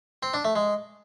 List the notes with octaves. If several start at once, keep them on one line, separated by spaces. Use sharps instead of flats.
C4
D4
A3
G#3